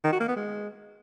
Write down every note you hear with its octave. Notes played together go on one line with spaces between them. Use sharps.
D#3
F#4
A#3
B3
G#3